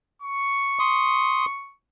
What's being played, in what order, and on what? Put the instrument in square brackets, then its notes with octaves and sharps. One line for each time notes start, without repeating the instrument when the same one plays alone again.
[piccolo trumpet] C#6
[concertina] C6 D#6